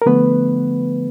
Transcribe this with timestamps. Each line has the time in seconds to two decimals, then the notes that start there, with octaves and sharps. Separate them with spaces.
0.02 A#4
0.06 D3 F3 A3 B3 B4